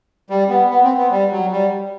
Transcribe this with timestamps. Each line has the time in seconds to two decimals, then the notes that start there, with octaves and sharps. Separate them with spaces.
0.30 G3
0.49 B3
0.70 B3
0.84 C4
0.97 B3
1.10 G3
1.31 F#3
1.52 G3